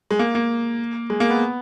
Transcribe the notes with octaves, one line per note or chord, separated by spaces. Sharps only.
G#3
A#3
A#3
G#3
A#3
B3